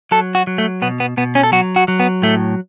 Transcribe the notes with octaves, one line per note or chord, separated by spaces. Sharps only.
F#3 A4
F#4
F#3
A3
B2 B3
B3
B2 B3
C#4
A4
F#3 F#4
F#4
F#3
B3
A2 A3